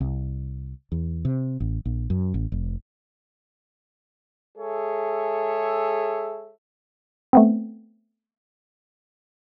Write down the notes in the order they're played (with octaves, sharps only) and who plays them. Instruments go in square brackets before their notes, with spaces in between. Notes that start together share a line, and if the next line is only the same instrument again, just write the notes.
[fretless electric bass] C2
E2
C3
A1
A#1
F#2
A1
F1
[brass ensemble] G#3 G#4 A4 C#5 E5
[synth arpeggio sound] A3 B3 C4